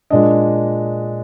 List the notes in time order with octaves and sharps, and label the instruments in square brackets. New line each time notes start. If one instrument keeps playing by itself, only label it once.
[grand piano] A#2 G#3 D4 D#5